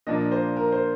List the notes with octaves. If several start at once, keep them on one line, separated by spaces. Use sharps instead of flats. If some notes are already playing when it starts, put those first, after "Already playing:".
A#2 F3 A#3 D4 D#5
C5
A#4
C5